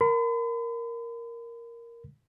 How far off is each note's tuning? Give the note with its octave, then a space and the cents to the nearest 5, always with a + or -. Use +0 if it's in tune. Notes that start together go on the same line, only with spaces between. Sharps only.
A#4 +0 B5 +45